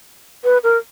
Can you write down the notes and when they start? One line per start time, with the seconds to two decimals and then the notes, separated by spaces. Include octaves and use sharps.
0.44 B4
0.64 A#4